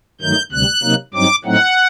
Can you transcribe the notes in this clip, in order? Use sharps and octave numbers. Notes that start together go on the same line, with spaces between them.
G2 D#3 F#3 A3 D#4 G6
D2 C3 G3 F#6
C3 F#3 A#3 D#4
G2 F#3 C4 D#4 D6
A2 F#3 A3 C4 D#4 F#5